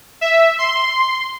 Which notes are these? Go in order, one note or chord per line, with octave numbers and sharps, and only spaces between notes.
E5
C6